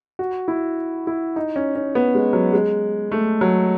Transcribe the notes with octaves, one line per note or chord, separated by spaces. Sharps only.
F#4
E4
E4
D#4
C#4
C#4
B3
G#3
F#3
G#3
A3
F#3